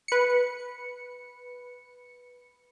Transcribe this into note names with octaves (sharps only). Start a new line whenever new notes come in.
B4 C#7